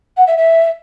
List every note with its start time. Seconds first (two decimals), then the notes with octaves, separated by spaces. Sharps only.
0.17 F#5
0.27 E5
0.37 E5